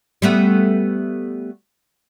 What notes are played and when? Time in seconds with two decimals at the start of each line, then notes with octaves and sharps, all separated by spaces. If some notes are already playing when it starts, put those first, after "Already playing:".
0.22 G3 A3 B3